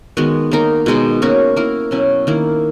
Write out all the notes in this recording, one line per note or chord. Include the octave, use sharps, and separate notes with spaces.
D#3 G#3 B3 F#4
A#3 D#4 A#4
B2 G#3 D#4
A#3 C#4 F#4 A#4
A#3 E4 A#4
B2 F#3 C#4 E4
D#3 A#3 E4